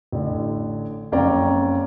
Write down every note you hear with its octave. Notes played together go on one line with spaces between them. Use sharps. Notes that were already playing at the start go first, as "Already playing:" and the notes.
A1 D3
F#1 F2 C#4 D5 G5 A#5